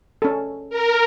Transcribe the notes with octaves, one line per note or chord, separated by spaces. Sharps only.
C#4 A4
A#4